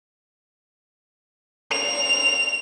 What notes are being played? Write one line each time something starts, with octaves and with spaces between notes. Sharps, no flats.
F7